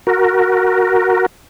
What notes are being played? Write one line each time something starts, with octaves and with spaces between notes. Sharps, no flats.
F#4 A#4